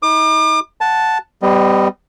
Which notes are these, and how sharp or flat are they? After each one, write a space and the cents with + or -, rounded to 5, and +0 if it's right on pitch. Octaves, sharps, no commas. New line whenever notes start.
D#4 +35 D6 +40
F#5 -5 A5 +0
G3 +0 B3 +45 D#5 -15